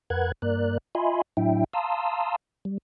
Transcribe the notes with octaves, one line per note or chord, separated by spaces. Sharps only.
F2 A#4 B4 F#5 F#6 G#6
G2 A#3 A#4 D5 F#6
F4 D#5 E5 G#5 B5 C6
A2 F#3 D4 E4 E5 G5
F5 A5 A#5 C6 D#6 E6
G3